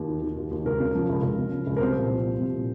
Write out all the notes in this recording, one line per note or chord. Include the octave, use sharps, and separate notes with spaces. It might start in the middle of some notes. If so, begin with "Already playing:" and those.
Already playing: D#2
D#3
D#3
D#2
D#2
C#2 A#4
C#3
F3
C#2
C#2
C#3
F3
C#2
A#4
C2 C5
A#2
F3
C2
C2
A#2